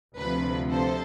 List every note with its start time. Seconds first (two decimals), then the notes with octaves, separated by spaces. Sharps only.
0.17 D2 C3 F3 B4
0.71 A4 C5